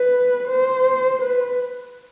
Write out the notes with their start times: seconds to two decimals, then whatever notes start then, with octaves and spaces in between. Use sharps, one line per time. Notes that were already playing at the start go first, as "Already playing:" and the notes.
Already playing: B4
0.48 C5
1.22 B4